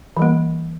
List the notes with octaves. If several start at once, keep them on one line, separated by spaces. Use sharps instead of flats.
E3 G3 A#3